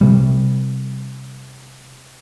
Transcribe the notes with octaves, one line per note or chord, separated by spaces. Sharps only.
C3 G3